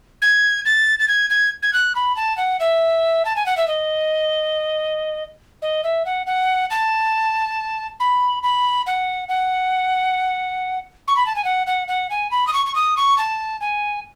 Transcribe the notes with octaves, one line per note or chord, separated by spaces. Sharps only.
G#6
A6
A6
G#6
G#6
G#6
F#6
B5
A5
F#5
E5
A5
G#5
F#5
E5
D#5
D#5
E5
F#5
F#5
A5
B5
B5
F#5
F#5
C#6
B5
A5
G#5
F#5
F#5
F#5
G#5
B5
D#6
C#6
C#6
D#6
C#6
A5
G#5